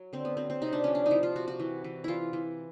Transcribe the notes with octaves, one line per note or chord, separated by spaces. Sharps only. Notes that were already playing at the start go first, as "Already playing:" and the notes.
Already playing: F#3
D3 C4
B3
F#3 C4
C4
C3 D#4
D4
F3 C#4
D4
D#4
F3 E4
F4
C3 F#4
F#4
E3
E3
E3 E4 F4
E3